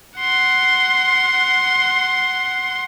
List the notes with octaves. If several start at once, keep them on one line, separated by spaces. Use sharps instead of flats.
F#5 C6